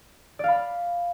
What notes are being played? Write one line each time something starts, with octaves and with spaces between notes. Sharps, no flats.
D5 F5 B5